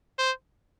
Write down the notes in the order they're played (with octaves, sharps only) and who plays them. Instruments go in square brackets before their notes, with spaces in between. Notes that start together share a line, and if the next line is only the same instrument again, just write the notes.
[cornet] C5